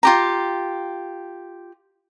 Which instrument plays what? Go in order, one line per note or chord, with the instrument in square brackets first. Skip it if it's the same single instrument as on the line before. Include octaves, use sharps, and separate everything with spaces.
[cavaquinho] F4 G4 A#5